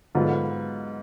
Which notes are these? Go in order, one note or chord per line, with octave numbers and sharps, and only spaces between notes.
G#2 D3 F#3 B3 F4